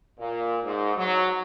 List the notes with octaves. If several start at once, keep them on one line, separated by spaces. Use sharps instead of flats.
A#2
G#2
F#3